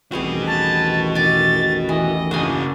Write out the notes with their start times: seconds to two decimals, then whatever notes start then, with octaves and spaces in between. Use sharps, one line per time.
0.12 A1 E2 D#3 G3 C4 F#4 G#4 B4
0.47 A5
1.15 G#5 D6 A6
1.89 E3 D#5
2.31 C#3 A#3 D4 F#4 G#5